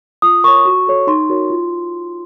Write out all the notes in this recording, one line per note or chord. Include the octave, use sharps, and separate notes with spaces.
F4 D#6
A#4 C#5 C#6
F#4
A4 C#5
D#4 C6
F#4 A#4 C#5
F4